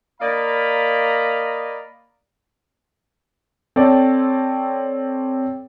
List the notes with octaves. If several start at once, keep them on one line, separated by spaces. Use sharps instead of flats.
A#3 D5 D#5 F5 A#5 B5
C4 A4 C#5 D5 G5